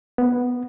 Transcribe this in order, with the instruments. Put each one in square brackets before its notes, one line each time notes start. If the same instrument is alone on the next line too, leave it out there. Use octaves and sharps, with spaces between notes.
[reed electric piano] B3